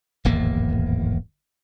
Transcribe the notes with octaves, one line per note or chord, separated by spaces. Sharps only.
D1 G#1 E2 A#3